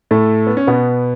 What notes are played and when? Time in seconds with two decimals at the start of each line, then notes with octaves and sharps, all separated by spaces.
0.11 A2 A3
0.47 B3
0.57 C#4
0.67 B2 B3